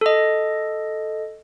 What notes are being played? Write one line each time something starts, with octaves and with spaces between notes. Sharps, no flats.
A4 D#5